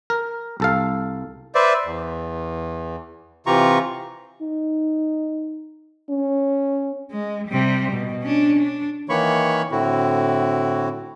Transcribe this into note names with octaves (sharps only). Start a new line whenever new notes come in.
A#4
C2 A4 F5
B4 C5 D5 E5
E2
C3 E3 F4 G4 A#5 C#6
D#4
C#4
G#3
C3 G3
B2
C#4 D4
D4
D#3 E3 A#3 C#5 B5 C#6
A2 D3 C4 E4 F#4